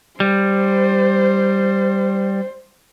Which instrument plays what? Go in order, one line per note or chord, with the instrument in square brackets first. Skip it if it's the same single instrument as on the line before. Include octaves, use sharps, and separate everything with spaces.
[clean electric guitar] G3 [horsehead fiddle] C5